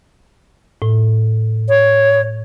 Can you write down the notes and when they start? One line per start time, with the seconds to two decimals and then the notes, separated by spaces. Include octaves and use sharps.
0.82 A2
1.69 C#5